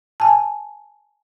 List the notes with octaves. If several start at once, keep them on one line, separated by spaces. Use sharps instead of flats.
G#5 A5